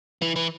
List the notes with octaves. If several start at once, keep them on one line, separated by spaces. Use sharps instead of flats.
E3
E3